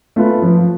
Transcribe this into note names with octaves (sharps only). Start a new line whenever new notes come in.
A3 F4 B4
F3